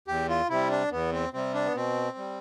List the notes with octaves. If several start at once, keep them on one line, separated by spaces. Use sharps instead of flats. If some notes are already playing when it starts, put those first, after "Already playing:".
E2 G4
F4
C3 G3 E4
D4
E2 B3
C4
C3 G3 C4
D4
B3
B2 C4
G3